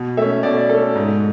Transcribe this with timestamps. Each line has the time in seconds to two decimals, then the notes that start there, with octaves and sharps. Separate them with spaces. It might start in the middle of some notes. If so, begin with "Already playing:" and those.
Already playing: B2
0.17 A3 E5
0.22 C#4
0.43 B2 D5
0.69 A3 C#4 A4
0.95 G#2